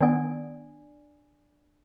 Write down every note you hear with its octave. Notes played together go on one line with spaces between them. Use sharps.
D#3 B3 D4 D5 G#5